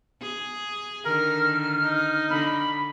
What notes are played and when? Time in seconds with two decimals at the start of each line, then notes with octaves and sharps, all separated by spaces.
0.22 G#4
1.05 D3 D#3 A#4 F6
1.81 D#4
2.30 D3 B5